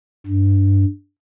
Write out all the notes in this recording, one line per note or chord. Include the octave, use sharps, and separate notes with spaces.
G2